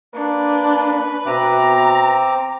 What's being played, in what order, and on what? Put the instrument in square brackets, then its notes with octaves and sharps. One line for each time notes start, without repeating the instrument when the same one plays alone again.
[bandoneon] A#3 [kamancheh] D4 [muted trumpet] B4
[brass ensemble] B2 E5 [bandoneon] C4 D6 [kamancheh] A#5